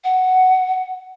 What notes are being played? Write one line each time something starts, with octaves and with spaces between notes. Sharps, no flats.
F#5